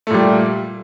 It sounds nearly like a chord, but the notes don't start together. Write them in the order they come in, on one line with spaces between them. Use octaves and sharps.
A3 A#2 G3